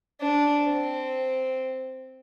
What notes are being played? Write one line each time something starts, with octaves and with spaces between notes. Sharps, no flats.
D4
C4